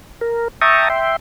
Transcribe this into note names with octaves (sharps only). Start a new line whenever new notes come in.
A#4
E5 G5 A5 A#5 C#6 D#6
E5 G5 C6